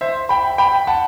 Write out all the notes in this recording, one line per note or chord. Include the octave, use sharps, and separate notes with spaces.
C5 E5
G5 B5
G5 B5
F#5 A5